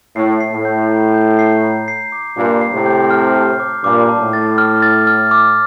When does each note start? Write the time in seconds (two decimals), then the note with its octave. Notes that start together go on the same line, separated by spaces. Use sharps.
0.16 A2 C7
0.41 C7
0.53 A2
0.65 G6
0.89 A#5
1.14 G6
1.39 C7
1.63 A#5
1.88 C7
2.12 D6
2.37 G2 A#2 D6
2.61 C7
2.74 A2 C3
2.86 G6
3.10 F6
3.35 A5
3.60 D6
3.84 G2 A#2 D6
4.09 A5
4.21 A2
4.33 A6
4.58 F6
4.82 A6
5.07 F6
5.31 D6